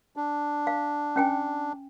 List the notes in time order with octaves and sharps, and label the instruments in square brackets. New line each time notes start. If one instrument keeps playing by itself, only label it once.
[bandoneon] D4
[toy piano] F5
C#4 G5 G#5